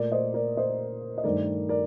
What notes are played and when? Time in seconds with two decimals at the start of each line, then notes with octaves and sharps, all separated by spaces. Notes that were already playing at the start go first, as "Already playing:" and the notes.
Already playing: A#2 A3 A#4 D5
0.12 C5 D#5
0.34 A#4 D5
0.57 C5 D#5
1.18 D#5
1.24 G2 D#3 A3 A#4 D5
1.69 A#4 D5